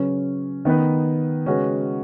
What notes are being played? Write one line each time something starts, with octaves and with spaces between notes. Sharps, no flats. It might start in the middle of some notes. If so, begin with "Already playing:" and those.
Already playing: C#3 F#3 C#4 B4
D#3 B3 D#4 B4
C#3 G#3 C#4 F#4 B4